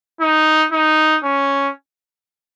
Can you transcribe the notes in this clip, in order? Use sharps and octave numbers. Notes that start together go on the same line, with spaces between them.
D#4
D#4
C#4